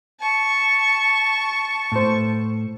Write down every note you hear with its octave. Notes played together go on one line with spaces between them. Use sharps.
A5 C#6
A2 C5